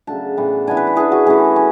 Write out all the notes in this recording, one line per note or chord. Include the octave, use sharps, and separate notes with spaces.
C#3 F#3 A3 D4 A5
A2 E3 B3
E3 B3 D4 G#5
B4
B4
E3 B3 D4 G#4
F#4
E3 A3 C#4 G#4
C#4